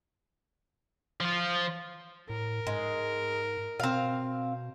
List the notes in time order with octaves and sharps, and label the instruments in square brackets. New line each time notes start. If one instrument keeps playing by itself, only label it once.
[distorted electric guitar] F3 F4
[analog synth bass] A2 [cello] A#4
[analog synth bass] G#2 [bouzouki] G#3
[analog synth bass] B2 [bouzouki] C4 F5